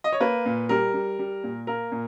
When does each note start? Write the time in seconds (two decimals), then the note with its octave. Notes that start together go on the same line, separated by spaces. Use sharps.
0.04 D#5
0.12 C#5
0.20 A#3 B4
0.46 A#2
0.69 G3 A#4
0.94 G3
1.19 G3
1.44 A#2
1.67 A#3 A#4
1.92 A#2